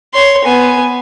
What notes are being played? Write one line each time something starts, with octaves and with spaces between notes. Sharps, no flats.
C#5 C6
B3 G#5